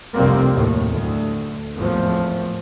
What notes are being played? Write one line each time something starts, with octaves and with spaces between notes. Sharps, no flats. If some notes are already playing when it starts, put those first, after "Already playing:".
F1 C2 G2 G3 A#3 C4
F#1 D#2 A2
D2
G#1 E2 A2 F3